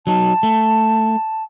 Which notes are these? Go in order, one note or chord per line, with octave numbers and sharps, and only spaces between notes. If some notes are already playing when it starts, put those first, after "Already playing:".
F#3 D#4 A5
A3